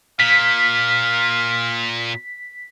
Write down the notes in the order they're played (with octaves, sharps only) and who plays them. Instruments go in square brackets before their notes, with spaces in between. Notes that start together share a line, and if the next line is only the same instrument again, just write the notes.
[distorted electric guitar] A#2 [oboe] F5 [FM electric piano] B6